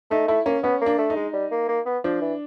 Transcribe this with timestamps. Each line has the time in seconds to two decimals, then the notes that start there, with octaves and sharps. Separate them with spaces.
0.11 A3 D#4
0.28 A3 E4
0.46 A#3 C#4
0.63 B3 C#4
0.81 A#3 D4
0.98 A3
1.10 D#4
1.16 G#3
1.33 G3
1.51 A#3
1.68 A#3
1.86 B3
2.04 F3 D4
2.21 E3